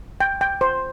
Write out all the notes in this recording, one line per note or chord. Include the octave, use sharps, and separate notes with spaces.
G5
G5
C5